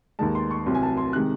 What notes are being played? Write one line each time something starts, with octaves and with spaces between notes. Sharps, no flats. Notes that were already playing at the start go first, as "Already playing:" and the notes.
D#2 D#3 G#3 A5
C6
C#6
C2 C3 F#3 C6
G#5
A5
C6
C3 D#3 G#3 F#6